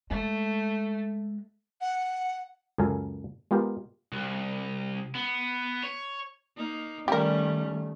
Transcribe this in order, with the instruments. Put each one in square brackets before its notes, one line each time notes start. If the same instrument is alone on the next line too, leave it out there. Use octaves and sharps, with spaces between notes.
[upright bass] G#3 [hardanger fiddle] A3
[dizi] F#5
[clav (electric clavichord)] C#2 F#2 C#3 A4 A#4 G#5
G#3 B3 F4 G4 A#4
[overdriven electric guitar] C2
B3
C#5
[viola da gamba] A#3 D#4
[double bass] D#3 A3 [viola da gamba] G3 C#4 [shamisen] G4 A#4